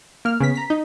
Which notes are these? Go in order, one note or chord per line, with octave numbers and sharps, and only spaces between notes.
A#3 F6
C#3 B3 B6
A#5 B6
D#4